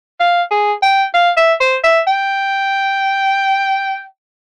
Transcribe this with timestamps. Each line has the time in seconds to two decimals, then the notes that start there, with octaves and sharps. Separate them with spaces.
0.20 F5
0.51 G#4
0.82 G5
1.14 F5
1.37 E5
1.60 C5
1.84 E5
2.07 G5